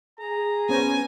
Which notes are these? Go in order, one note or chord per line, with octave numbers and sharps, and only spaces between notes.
G#4 A#5
B3 C#4 C5 G#5